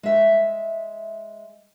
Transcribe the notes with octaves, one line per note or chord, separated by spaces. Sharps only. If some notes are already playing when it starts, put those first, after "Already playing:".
G#3 E5